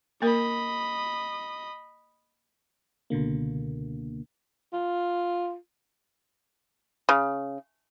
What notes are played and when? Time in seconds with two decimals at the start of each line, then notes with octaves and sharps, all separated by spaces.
0.22 A#3 A#4 D#5 B5
3.10 C#2 B2 D3 A#3
4.73 F4
7.09 C#3